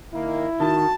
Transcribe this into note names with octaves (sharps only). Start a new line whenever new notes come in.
D#3 A#3 E4
D#3 F#4 A5